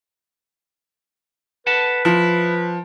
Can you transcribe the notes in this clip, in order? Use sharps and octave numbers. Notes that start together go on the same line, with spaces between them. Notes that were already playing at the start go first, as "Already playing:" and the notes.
A4 B4 F#5 A5
F3 E4